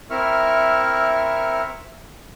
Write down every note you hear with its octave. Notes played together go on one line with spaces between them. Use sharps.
C4 E4 A#4 E5 C#6 F6